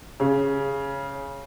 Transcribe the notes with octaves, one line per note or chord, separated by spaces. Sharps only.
C#3